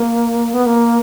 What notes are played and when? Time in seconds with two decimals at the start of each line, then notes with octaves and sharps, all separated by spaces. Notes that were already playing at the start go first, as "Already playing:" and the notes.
Already playing: A#3
0.54 B3
0.66 A#3